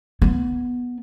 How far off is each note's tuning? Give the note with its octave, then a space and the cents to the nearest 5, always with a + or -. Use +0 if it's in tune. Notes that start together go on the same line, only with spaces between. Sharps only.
B3 -5